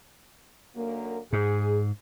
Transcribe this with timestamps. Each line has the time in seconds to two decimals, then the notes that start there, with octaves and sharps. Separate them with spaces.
0.75 F#2 D3 A#3
1.33 G#2 G#4